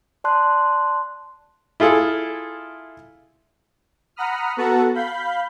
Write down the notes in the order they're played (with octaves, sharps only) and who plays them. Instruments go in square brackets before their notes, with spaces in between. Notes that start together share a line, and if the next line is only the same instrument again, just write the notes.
[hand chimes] D5 A5 C6 F#6
[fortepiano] E4 F4 G#4 A4
[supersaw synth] F#5 A#5 B5 D#6 F6
B3 F#4 A4 F#5 A5 A#5
F5 B5 G6